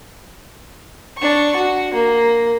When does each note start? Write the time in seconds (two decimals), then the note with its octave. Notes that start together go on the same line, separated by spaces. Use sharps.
1.18 D4 C#6
1.56 F#4
1.94 A#3